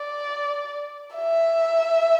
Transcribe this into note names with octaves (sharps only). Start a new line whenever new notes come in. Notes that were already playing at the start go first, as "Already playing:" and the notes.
Already playing: D5
E5